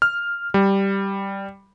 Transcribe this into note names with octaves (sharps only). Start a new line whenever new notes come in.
F6
G3